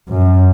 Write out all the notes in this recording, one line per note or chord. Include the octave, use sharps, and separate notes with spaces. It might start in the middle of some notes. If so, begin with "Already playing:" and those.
F#2